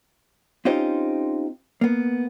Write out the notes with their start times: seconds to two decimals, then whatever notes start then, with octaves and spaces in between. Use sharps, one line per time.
0.65 C4 C#4 D#4 F4 G4 C5
1.81 A#3 B3